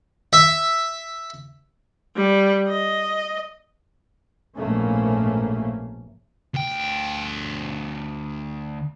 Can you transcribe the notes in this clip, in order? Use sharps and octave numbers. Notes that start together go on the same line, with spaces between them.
E5
G3
D#5
A#1 G#2 B2 A3 A#3 C#4
D2 G5